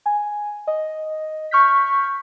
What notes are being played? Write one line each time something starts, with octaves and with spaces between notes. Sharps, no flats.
G#5
D#5
C#6 F6 G6 B6